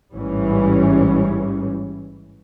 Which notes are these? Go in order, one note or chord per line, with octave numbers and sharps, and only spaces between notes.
A1 G#2 E3 G3 C#4